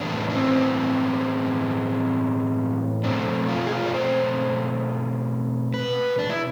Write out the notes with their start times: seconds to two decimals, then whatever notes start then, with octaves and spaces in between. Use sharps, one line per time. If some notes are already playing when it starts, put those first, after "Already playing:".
Already playing: A2 E3 B3 D4
0.30 D4
0.34 C4
3.04 B2 A3 C4 D4
3.48 F4
3.66 G#4
3.72 F4
3.86 D5
3.94 C5
5.74 B4
6.19 D4
6.30 E4